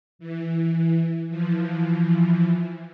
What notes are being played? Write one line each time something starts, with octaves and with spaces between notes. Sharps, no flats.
E3
E3 F3